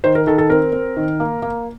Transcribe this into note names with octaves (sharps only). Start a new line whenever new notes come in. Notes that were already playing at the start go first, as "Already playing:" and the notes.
D#3 C5
A#4
D#3 A4
A4
C4 A#4
C4
D#3
A#3
A#3